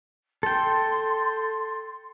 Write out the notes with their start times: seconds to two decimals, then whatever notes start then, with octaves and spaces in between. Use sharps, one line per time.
0.43 A4 G5 C6